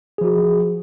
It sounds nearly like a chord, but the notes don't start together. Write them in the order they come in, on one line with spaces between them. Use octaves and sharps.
G#4 F3 F#4